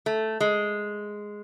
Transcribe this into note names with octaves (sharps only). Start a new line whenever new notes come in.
A3
G#3